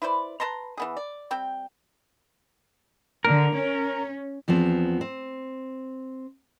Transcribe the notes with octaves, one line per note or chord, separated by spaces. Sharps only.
E4 B4 C5 D5
B4 A5 A#5 C6
E3 B3 G#4
D5
G3 C4 G5
D3 A#4
C#4
E2 F3 B3 C4
C4